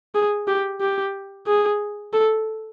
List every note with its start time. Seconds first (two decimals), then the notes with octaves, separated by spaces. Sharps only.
0.15 G#4
0.48 G4
0.81 G4
1.47 G#4
2.13 A4